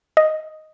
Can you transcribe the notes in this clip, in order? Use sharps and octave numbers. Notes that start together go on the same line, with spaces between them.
D#5